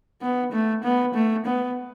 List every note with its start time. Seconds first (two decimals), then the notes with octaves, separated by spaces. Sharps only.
0.22 B3
0.52 A3
0.84 B3
1.14 A3
1.46 B3